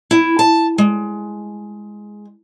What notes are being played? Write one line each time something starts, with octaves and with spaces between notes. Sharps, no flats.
E4
A5
G#3